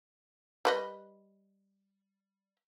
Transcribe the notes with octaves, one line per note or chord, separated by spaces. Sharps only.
G3 B4 D#5